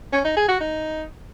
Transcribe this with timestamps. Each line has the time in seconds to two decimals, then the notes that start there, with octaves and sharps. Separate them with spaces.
0.12 C#4
0.24 D#4
0.36 G#4
0.48 F#4
0.60 D#4